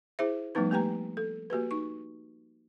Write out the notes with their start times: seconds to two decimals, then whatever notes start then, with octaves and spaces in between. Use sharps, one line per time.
0.19 E4 G#4 C5 E5
0.55 F3 G3 A3 B3 D#4 B4
0.71 A3 A#3 G4 B4 G5 A#5
1.17 A4
1.50 A#3 F#4 G4 B4
1.71 D#4 C#6